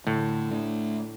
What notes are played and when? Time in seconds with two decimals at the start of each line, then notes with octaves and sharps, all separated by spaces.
0.07 A2 D3
0.51 A3 D4